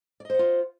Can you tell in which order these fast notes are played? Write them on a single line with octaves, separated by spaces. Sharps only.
D5 D#5 C5 F#5 F4